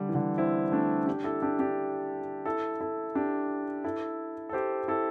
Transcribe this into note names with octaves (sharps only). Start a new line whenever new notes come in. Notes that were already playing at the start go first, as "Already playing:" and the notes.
Already playing: D3 G3
E3
D3 G3
C4 E4
A3 D4
D4 G4
E4 A4
D4 G4
D4 G4
E4 A4
E4 A4
D4 G4
E4 A4
A4
G4 C5
E4 A4